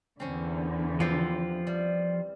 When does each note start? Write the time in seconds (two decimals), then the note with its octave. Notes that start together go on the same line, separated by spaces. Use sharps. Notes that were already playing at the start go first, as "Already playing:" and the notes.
0.20 E2 D3 C4 C#4
1.00 E3 F3 C4 F4 G4
1.67 G3